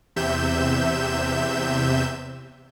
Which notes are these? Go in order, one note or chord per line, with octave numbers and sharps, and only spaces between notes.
E2 C3 E5 G6 E7